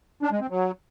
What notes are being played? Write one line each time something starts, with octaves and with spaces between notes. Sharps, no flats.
D4
G#3
C4
F#3